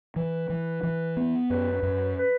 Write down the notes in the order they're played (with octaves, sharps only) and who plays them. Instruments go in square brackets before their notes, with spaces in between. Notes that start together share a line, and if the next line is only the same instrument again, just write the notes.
[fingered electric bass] E3 [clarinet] B4
[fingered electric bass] E3
E3
B3
[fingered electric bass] F#2 [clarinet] B4
[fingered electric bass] F#2
[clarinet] B4